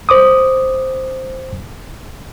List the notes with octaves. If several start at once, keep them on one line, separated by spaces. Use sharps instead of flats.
C5 D6 D#6